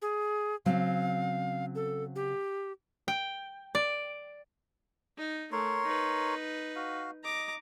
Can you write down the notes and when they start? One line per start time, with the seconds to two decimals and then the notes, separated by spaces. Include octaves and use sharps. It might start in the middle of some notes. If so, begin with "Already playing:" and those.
0.02 G#4
0.66 C#3 F#3 C4 F5
1.75 A4
2.16 G4
3.08 G5
3.75 D5
5.17 D#4
5.52 A3 A#4 C#5 C6
5.86 D#4 B4
6.76 F#4 F5
7.24 D#5 A#5 D6